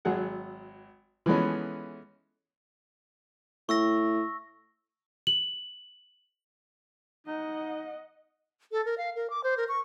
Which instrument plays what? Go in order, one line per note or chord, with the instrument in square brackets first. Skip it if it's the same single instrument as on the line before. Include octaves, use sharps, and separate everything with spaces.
[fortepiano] G#1 F#3 G#4 F#5
E3 F3 G#3 A3 B3 C#4
[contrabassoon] A2 [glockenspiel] C#6 E6 A#6
[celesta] F#7
[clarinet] D#4 [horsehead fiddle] D#5 F#5
[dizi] A4
A#4
F5
A#4
D6
C5
A#4
C#6